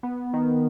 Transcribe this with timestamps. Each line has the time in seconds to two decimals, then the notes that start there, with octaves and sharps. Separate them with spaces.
0.03 B3
0.33 D#3